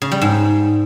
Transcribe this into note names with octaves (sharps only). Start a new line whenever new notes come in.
C#3
G3
G#2